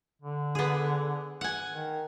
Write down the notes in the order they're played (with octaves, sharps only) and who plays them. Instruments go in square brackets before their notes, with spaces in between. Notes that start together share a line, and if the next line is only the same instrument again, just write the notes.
[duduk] D3
[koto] B3 G#4
F#5 G#5
[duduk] D#3